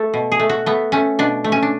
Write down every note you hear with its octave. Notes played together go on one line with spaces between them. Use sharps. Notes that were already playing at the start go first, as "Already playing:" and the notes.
Already playing: A3 A4
B2
G#4
A3
F#4
A3 B3
A3 C#4
B2 D4
A3
C#4
D4